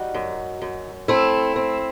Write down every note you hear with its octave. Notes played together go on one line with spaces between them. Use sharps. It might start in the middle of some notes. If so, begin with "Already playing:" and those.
Already playing: G3 D#4 F#4
F#2
F#2
A3 C4 E4
C4